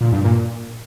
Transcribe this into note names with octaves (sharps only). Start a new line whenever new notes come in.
A#2
G2
A#2